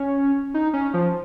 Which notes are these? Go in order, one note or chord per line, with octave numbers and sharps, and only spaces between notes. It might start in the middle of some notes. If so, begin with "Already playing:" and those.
Already playing: C#4
D#4
C#4
F3